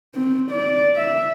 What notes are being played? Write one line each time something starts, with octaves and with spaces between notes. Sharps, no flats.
C4
D5
E5